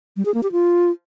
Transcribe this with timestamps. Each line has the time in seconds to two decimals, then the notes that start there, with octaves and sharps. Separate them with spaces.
0.17 G3
0.25 G#4
0.34 A#3
0.43 G4
0.52 F4